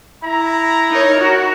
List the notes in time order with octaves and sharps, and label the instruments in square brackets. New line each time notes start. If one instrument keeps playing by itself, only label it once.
[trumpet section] E4 A#5
[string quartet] D#4 A#4 C#5
F#4